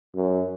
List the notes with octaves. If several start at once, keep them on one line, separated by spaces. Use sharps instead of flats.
F#2